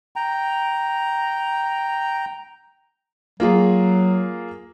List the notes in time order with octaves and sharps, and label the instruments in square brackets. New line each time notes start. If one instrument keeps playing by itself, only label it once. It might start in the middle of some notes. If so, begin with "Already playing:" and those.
[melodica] G5 A#5
[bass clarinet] F#3 [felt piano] A#3 F4 G#4